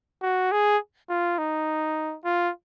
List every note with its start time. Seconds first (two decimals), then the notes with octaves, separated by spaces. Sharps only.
0.23 F#4
0.52 G#4
1.09 F4
1.38 D#4
2.25 F4